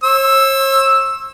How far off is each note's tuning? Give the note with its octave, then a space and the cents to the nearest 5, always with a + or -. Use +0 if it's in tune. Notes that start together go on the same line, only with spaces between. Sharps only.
C#5 -45 E6 +0